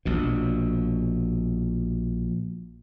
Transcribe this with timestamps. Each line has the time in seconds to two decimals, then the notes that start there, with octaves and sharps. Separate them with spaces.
0.05 A#1 B2